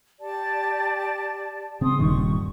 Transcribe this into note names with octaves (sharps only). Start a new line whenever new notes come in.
G4 D5 A5
C#3 C4 C6 D#6
D#1 G2 D#3 C#6